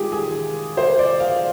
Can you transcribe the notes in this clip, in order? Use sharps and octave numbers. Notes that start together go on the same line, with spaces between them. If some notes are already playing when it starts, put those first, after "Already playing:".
Already playing: D#3 G#3 F4 G4 G#4
G#4
C5
D5
F5